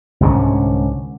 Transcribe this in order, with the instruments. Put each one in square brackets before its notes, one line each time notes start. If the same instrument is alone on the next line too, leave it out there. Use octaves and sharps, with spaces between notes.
[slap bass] C2 G#2 D3 C#4